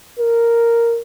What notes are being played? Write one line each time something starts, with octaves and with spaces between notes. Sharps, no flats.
A#4